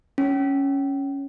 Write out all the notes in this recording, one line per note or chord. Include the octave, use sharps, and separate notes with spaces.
C#4